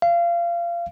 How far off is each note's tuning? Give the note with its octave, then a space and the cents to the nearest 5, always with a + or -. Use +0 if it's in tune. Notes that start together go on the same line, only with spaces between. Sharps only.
F5 -25